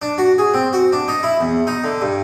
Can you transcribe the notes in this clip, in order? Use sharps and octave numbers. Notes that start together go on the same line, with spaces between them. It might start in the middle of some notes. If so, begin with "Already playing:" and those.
D4
F#4
G#4
C4
F#4
D4
D#4
E4
E2
D#4
D3
G2